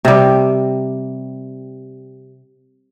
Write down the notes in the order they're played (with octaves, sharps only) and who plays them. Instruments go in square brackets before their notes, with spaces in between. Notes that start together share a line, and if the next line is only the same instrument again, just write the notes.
[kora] C3 G3